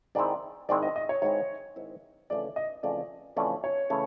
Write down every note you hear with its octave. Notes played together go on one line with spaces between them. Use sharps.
G#2 D#3 G#3 C4 E4 D5
G#2 D#3 G#3 C4 E4 D5
D#5
D#5
C#5
G#2 D#3 G#3 C4 E4 C#5
G#2 D#3 G#3 C4 E4
F2 C#3 E3 A3 C#4 D5
D#5
F2 C#3 E3 A3 C#4 D5
F2 C#3 E3 A3 C#4 D5
C#5
C#3 E3 A3 C#4